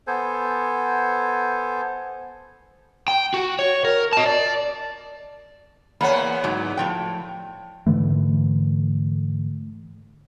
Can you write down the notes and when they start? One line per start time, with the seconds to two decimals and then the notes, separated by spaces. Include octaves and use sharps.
0.07 B3 A4 C5 G#5
3.08 G5
3.34 F#4
3.59 C#5
3.85 A#4
4.13 D#5 A5
4.26 D5
6.01 E2 A#3 B3 C#5 F#5 B5
6.44 G#2 F#3
6.77 A2 F3 G5
7.87 G#2 D3 E3 A3